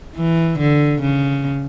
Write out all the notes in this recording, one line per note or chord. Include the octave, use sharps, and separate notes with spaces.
E3
D3
C#3